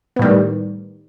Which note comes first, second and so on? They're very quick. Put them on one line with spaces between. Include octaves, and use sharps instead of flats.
B3 A2 G3 D#3